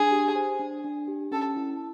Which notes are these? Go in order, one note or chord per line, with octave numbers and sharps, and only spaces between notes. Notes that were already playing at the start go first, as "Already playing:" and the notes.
Already playing: D4 G#4
G4
C5
D4
D4
G4
C#4 A4
E4